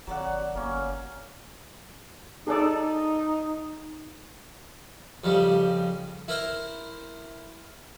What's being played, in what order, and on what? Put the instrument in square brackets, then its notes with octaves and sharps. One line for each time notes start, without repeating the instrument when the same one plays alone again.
[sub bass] G#1 [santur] F#3 F#5 [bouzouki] A4 D5
[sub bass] G1 [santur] A#3 C#4
[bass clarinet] D#4 [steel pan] G#4 A4 D5
[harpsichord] F2 C#3 G3
E4 A#4 C5